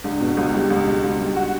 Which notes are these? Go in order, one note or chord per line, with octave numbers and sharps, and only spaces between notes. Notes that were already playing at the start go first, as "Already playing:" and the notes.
C#2 D4
B2 F#4
C#2 F#4
G3 E4
C#2 G4
B2
C#2
G3
F#4